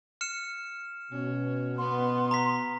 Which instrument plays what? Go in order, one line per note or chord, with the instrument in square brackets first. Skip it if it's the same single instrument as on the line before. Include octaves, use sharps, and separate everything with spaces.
[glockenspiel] F6 C#7 E7
[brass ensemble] B2 [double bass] C#4
[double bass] B3 [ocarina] C6
[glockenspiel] A#5 B6